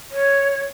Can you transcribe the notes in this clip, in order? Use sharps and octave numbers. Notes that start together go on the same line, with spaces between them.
C#5